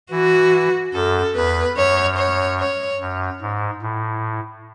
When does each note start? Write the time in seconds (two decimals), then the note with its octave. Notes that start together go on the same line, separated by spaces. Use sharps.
0.11 E3 F#4
0.94 F#2 A4
1.35 E2 B4
1.76 F#2 C#5
2.18 C#5
2.59 C#5
3.01 F#2
3.42 G#2
3.82 A2